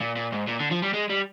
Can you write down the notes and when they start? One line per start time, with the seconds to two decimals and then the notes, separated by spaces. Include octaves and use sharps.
0.01 A#2
0.16 A#2
0.32 G#2
0.48 A#2
0.60 D3
0.71 F3
0.83 G3
0.94 G#3
1.10 G3